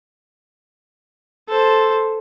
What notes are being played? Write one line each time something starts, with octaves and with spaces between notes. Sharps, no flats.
A4 C5